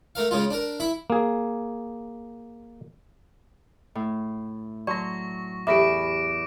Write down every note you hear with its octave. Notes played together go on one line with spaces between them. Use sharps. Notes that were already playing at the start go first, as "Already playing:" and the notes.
A3 A#4 F5
C#3 G#3 F4
D4 A#4
E4 E5
A#3 G#4
A2
F#3 D5 A5 C6 C#6 A#6
E2 G4 A4 E5 B5 D6 A#6 D7